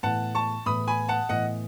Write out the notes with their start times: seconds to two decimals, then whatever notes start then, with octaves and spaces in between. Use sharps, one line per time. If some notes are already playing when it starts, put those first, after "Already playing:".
0.03 A2 E3 B3 F#5 A5
0.35 A5 C#6
0.66 A2 E3 B3 B5 D#6
0.88 G#5 B5
1.09 F#5 A5
1.29 A2 E3 B3 D#5 F#5